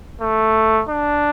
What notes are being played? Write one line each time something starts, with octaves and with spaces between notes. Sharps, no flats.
A3
D4